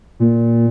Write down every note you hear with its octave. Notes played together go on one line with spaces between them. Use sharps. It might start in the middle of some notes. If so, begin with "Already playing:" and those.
A#2